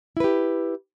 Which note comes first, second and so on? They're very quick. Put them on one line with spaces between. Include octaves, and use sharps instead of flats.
E4 B4 G4